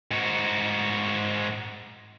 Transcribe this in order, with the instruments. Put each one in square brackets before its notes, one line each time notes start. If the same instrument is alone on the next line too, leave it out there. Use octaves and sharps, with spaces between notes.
[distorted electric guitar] G#2 F#4